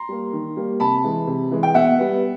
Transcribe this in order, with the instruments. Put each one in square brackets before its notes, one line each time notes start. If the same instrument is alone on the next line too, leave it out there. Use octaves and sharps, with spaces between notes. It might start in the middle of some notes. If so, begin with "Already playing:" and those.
Already playing: [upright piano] A#5 C6
G3 A#3
D#3
G3 A#3
C3 A5 B5
E3 G#3
C3
E3 G#3
G5
B2 E5 F#5
G3 B3